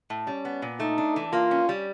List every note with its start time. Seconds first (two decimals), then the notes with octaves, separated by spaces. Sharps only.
0.10 A2
0.27 G3 C#4
0.45 B3
0.62 A#2
0.80 A3 D#4
0.98 D4
1.16 E3
1.33 A#3 F4
1.51 C#4
1.69 G3